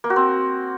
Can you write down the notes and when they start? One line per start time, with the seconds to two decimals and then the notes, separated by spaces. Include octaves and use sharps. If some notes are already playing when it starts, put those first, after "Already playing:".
0.04 A#3
0.10 F#4
0.16 C4